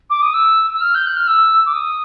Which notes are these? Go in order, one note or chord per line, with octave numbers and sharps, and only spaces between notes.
D6
D#6
E6
E6
F6
G6
F#6
F6
E6
D6
D#6